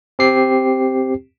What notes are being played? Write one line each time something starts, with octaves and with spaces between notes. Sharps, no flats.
C4 G4 C7